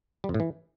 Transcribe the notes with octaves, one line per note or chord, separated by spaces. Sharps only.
G3
F2
A2
E3